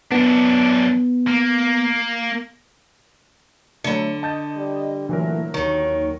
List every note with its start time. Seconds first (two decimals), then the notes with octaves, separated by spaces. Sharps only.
0.12 F#2 B3 D4
1.27 A#3
3.84 D3 F#3 A3 B5 C#7
4.23 D#5 A5 G6 A6
4.56 G3
5.09 A#2 D3 E3 F#3 A3 A#4
5.54 D#2 D#3 C#5 C#6